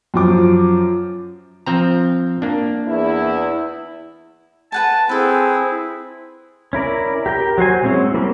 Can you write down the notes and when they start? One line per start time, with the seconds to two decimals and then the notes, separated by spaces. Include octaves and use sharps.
0.14 F#2 F3 D6
1.66 F3 C4 A#5
2.42 A#3 D4
2.87 E2 E4
4.72 B4 F#5 G#5 A5
5.09 C4 E4 G#4 A4 B4
6.73 C#4 E4 A#4 D5
7.26 G4 A#4 G5
7.58 F#3 F#4 C5 G#5
7.83 F#3 G#3 C4 C#4 E4
8.14 G3 A#3 C4 C#4